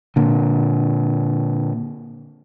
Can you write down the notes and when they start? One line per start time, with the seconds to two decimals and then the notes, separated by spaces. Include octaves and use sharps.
0.16 A#2 D3